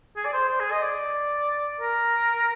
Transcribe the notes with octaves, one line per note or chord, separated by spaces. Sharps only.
G#4
D5
C5
C5
G#4
D#5
D5
A#4